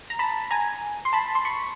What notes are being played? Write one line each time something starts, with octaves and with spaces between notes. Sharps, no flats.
A#5
A5 B5
G#5 A#5
C6
A5 B5
C6
B5 C#6